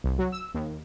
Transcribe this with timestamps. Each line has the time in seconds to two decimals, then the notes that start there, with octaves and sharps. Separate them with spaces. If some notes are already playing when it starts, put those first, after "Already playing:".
0.04 C2
0.19 F#3
0.32 E6
0.54 D#2